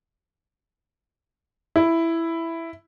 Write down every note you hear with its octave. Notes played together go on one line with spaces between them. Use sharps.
E4